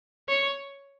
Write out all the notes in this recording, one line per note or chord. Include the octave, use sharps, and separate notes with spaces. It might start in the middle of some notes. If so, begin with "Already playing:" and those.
C#5